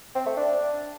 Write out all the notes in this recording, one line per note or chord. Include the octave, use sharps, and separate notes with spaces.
C4
A3
D4